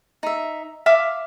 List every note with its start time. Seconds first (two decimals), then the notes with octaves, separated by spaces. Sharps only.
0.23 D#4 E5
0.86 E5 F5 D6